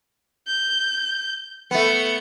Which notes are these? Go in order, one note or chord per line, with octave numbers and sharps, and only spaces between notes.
G6
A3 B3 C#7